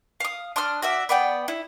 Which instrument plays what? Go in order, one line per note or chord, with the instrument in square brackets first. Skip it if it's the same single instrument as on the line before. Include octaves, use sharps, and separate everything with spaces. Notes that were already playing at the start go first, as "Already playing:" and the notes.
[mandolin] F5 D#6
D4 C6 D#6 F6
F#4 D5 E5
B3 D5 F#5 G5
E4